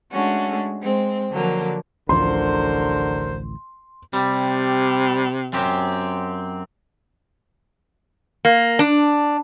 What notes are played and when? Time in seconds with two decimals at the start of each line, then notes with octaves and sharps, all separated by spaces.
0.11 G#3 A3 C#4 D4 F#4
0.81 G#3 C4
1.31 D3 F3 F#3 A#3
2.09 A1 D2 D3 F3 F#3 A#4 C5 C6
4.13 C3 G3
5.53 F#2 C4 G4
8.45 A#3
8.79 D4